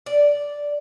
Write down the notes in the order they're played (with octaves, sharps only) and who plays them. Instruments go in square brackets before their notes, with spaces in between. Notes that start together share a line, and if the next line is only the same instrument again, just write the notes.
[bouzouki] D5